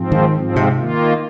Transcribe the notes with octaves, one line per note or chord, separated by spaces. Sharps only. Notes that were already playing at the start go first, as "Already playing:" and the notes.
Already playing: G#2 F3 C4
D#3
G#2 F3 C4
C3
D#3 A#3 F4